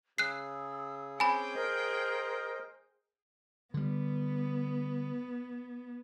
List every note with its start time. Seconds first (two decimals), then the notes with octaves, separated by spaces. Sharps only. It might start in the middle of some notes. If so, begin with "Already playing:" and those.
0.18 C#3 G#4 E6 F#6 C7
1.20 C4 C#4 G#4 G5 G#5 B5 D6
1.55 A#4 C5 D#5
3.74 D3 G3 B3